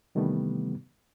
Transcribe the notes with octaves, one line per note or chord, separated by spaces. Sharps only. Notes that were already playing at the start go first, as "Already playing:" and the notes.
C3 D#3 E3 G3 A3 B3